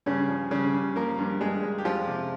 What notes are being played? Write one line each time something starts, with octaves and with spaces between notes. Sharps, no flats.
G2 C#3 C#4
F3
G2 C#3 C#4
G2
F3 A#3 A#4
G2
G2 G#3 G#4
G#3
G4
F2 F3 F4
C3